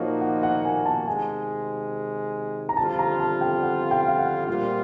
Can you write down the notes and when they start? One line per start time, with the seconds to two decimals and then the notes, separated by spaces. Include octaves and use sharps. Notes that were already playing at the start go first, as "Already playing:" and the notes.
Already playing: A#2 F3 A#3 D#4 F#4 C#5 F5
0.21 F#5
0.43 F#5
0.65 G#5
0.86 A5
1.07 C3 D#3 G#3 G#5
2.69 A#5
2.77 F2 D3 G3 C4 F4 A5
2.99 A#5
3.20 A5
3.41 G5
3.63 F#5
3.91 G5
4.08 F5
4.19 F#5
4.47 A#2 G3 C4 F4 F#5